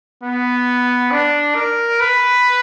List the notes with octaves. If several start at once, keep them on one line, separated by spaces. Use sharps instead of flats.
B3
D4
A#4
B4